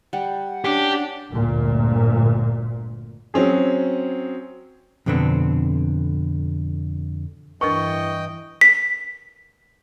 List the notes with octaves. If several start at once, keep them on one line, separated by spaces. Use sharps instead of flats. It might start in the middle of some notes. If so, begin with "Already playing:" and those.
G3 F#5
C#4 D4 G4
G1 D2 A#2
F#3 C4 C#4 G#4
F2 B2 D3 B3 C4
G2 E3 D4 A#4 B4 D#5 G5 C#6
B6